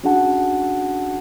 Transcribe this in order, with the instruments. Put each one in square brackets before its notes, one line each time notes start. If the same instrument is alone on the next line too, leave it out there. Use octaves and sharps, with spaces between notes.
[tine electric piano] C#4 D4 F#4 G#4 F#5 A5